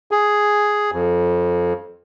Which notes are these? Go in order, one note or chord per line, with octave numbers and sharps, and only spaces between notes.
G#4
F2